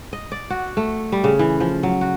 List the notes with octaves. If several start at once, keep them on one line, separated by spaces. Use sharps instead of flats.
D#5
D5
F#4
A3
G3
C#3
E3
F3
F#3
F#4